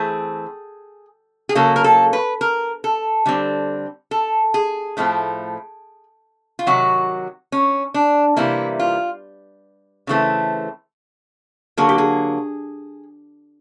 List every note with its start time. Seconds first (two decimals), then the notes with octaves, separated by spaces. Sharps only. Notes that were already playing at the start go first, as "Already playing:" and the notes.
Already playing: E3 A3 C4 G#4
1.49 G#4
1.55 C#3 F#3 A#3 A4
1.76 A#4
1.84 A4
2.13 B4
2.41 A#4
2.84 A4
3.26 D3 G3 C4
4.11 A4
4.54 G#4
4.97 A2 F3 A3 C4
6.59 F4
6.67 C3 D#3 F#3 F#4
7.52 C#4
7.94 D4
8.36 C3 E3 G3 A#3 E4
8.80 F4
10.07 C#3 E3 A3 C4
11.77 D3 F#3 A#3 G#4
11.89 G4
11.98 G#4